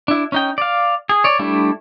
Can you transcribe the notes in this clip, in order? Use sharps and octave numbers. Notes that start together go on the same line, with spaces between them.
D4 E4
C#4 D#4 G5
D5 F5
G#4
C#5 D5
G3 A3 D4 E4